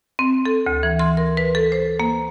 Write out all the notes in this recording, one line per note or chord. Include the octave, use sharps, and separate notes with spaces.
C4
A4
D2
E3
C6
A#4
B4
A4
C5
A#3